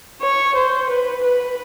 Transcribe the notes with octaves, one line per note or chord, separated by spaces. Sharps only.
C#5
C5
B4
B4